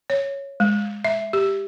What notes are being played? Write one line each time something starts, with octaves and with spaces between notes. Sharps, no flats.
C#5
G#3
E5
G4